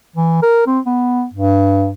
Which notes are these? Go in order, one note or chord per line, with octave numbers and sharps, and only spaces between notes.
E3
A#4
C4
B3
G2